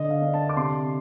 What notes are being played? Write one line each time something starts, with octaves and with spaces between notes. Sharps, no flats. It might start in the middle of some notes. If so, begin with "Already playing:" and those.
Already playing: D3 D#5
F5
D4
A5
D6
C3 C6